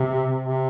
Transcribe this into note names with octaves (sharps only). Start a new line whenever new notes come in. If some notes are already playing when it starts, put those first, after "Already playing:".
Already playing: C3
C3